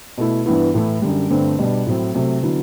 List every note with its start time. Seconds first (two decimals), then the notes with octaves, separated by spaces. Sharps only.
0.18 B2 A3 E4
0.46 G2 E3 B3 E4
0.74 A2 E3 A3 E4
1.02 F#2 D3 G3
1.30 G2 D3 A3 C4
1.59 B2 G3 D4
1.86 A2 F#3 C4 E4
2.14 C3 F#3 A3
2.42 D3 F#3 B3 E4